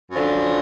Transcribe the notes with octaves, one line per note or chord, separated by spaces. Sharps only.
F#2 D3 F3